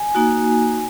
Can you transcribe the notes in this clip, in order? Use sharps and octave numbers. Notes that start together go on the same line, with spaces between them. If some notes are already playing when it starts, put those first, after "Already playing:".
Already playing: G#5
A#3 D#4 F#4